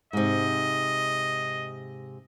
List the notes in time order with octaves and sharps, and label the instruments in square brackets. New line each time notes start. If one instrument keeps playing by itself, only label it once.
[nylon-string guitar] G#2 C3 [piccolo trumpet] D#5